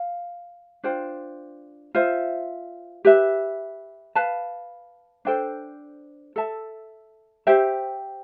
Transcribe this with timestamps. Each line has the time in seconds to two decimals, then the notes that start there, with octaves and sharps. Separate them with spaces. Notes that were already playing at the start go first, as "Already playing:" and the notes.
Already playing: F5
0.83 D4 F4 C5 G5
1.95 F4 C5 E5
3.05 G4 B4 E5
4.15 B4 F5 A5
5.25 D4 A4 C5 G5
6.36 A4 E5 A5
7.47 G4 C5 E5 G5